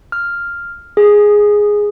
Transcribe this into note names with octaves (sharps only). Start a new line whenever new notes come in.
F6
G#4